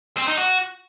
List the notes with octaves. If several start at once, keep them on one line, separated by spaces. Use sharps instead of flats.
C4
D#4
F#4